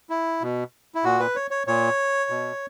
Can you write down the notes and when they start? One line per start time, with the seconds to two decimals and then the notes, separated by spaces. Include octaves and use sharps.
0.10 E4
0.42 B2
0.95 E4
1.04 A#2 F#4
1.20 B4
1.36 C#5
1.51 C#5
1.67 A#2 C#5
2.30 B2